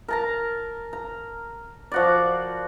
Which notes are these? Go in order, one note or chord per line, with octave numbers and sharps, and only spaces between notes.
A#4 A5 A#5
A#5
F3 F#4 D5